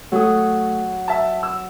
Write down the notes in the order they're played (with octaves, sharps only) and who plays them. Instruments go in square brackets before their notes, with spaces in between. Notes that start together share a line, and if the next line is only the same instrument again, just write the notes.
[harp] F#3 D#6 [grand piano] A3
[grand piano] E5 A5
E6